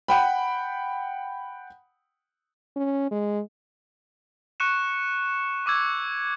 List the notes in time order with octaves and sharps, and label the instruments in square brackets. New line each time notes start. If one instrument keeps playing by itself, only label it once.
[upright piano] F#5 G5 B5
[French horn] C#4
G#3
[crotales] C#6 F#6 C#7 E7
C#6 D6 E6 G#6